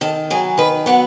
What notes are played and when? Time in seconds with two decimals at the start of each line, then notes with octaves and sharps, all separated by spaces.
0.01 D#3 A4
0.30 F#3 B3 G#4
0.58 D#3 B4
0.86 F#3 B3 F#5